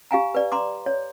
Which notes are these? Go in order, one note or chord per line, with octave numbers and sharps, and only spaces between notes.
G4 F5 G#5 A#5
B4 D5
A#5 C6 D6
C#5